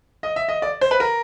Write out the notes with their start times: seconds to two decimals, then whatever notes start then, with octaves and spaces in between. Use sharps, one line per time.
0.23 D#5
0.36 E5
0.48 D#5
0.62 D5
0.81 C5
0.91 B4
1.00 A#4